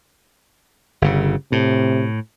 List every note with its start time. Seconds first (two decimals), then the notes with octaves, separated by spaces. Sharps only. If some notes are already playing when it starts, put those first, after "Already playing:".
1.02 G1 C#3
1.52 A2 C3